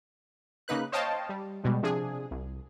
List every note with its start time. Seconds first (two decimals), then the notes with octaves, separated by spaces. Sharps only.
0.68 C#3 A#3 D#4 B4 F#6
0.92 C5 C#5 D#5 F5 G5 A5
1.29 G3
1.64 B2 G3 G#3
1.83 C3 F3 D4 G#4
2.31 C2